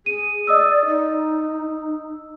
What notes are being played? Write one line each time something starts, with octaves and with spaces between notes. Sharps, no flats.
G#4 D#7
D5 D#5 D#6 E6
D#4